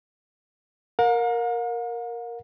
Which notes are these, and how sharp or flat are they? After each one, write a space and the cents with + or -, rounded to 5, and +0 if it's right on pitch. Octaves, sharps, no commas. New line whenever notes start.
A#4 +0 F5 +45